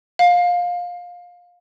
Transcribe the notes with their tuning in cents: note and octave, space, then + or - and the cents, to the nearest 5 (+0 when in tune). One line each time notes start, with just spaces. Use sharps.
F5 +20